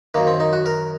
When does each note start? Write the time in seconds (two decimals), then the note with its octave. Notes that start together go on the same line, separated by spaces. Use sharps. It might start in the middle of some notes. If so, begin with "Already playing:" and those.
0.14 F#2 D#3 A#3
0.27 C4
0.40 D#4
0.53 F#4
0.66 A#4